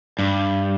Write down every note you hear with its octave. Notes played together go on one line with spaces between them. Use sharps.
G2